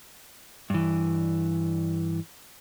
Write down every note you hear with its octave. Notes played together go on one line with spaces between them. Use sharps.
G2 E3